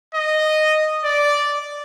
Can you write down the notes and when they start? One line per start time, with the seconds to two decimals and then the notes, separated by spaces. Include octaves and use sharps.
0.15 D#5
1.04 D5